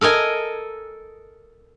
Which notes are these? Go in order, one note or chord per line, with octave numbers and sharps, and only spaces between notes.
A4 A#4 D#5 G#5